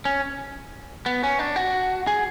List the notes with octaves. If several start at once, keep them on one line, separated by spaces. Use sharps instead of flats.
C#4
B3
C#4
D4
F#4
G#4